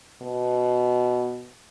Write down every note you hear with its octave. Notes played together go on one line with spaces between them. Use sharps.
B2